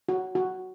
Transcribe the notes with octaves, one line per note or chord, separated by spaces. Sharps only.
F#4
F#4